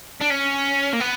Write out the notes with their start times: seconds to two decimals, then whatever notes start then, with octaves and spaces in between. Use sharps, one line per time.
0.21 D4
0.31 C#4
0.93 A#3
1.00 B3